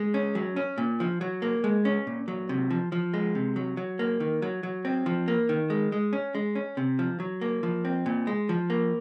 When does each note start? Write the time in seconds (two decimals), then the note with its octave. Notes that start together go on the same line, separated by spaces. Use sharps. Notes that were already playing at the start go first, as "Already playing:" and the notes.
Already playing: G#3
0.14 C#4
0.35 F#3
0.56 C#4
0.78 A#2
1.00 F3
1.21 F#3
1.42 A#3
1.64 G#3
1.85 C#4
2.07 A#2
2.28 F#3
2.49 C3
2.70 F3
2.92 F3
3.14 G#3
3.35 C3
3.56 F#3
3.77 F#3
3.99 A#3
4.20 D#3
4.42 F#3
4.63 F#3
4.85 C4
5.06 F3
5.28 A#3
5.49 D#3
5.70 G#3
5.92 G#3
6.13 C#4
6.35 G#3
6.55 C#4
6.77 C3
6.99 F3
7.20 F#3
7.41 A#3
7.63 F3
7.85 C4
8.06 A#2
8.27 G#3
8.49 F3
8.70 A#3